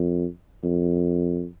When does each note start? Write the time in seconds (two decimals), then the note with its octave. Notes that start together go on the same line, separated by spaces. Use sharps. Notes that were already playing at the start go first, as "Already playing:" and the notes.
Already playing: F2
0.63 F2